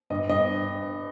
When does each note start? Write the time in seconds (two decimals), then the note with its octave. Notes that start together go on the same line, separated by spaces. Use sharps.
0.10 G2 D#5
0.29 G2 D#5